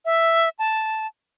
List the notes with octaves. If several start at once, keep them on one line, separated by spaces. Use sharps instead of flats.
E5
A5